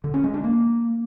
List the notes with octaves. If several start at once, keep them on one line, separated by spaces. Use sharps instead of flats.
D3
C#4
G#3
D4
A#3